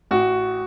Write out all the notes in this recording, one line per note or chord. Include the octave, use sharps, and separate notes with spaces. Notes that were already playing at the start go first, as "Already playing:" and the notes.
A1 F#4